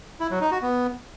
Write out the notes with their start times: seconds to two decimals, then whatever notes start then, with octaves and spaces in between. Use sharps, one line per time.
0.20 E4
0.30 F#3
0.41 D#4
0.51 F#4
0.62 B3